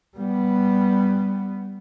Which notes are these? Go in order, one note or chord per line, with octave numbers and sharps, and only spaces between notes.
G3 B3